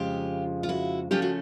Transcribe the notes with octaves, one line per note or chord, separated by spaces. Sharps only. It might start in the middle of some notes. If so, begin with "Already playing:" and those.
Already playing: F2 C#3 F3 G#3 F4 G4
F4
E4 F#4
C#3 F3 A3 C#4 F4 G4
F#4 G#4